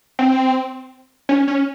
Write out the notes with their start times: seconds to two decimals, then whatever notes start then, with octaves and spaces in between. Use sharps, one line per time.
0.19 C4
1.29 C#4
1.47 C#4